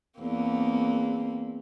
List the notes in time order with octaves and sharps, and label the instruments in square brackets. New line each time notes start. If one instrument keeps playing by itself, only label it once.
[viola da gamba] E2 A#3 C4